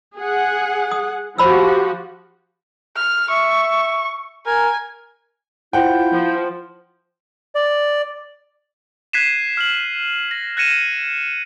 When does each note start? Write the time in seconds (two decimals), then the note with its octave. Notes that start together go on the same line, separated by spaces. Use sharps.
0.16 G#4 F#5
0.91 D#6
1.38 F3 F#4 G4 C5 B5 E6
2.96 F6
3.30 E5 C#6
4.46 A#4 G#5
5.73 E4 F4 C5 F#5 G5 G6
6.13 F3
7.55 D5
9.13 F#6 G#6 B6 C7 D#7 E7
9.57 F6 E7 F#7
10.31 A#6
10.57 F#6 G#6 A#6 C#7 D#7 E7